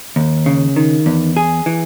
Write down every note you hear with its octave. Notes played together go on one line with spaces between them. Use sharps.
D#2
C#3
D#3
E2
G#4
E3